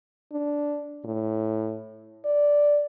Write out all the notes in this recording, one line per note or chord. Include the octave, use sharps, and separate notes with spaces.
D4
A2
D5